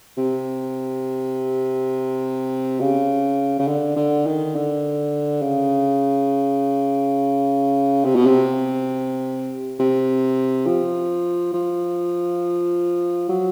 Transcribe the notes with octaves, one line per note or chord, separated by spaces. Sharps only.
C3
C#3
C#3
D3
D3
D#3
D3
C#3
C3
B2
C3
C3
F3
F3
F#3